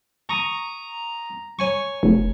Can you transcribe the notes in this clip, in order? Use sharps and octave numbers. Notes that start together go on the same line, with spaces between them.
A#5 C#6 D#6
C#5 G#5 C#6
F1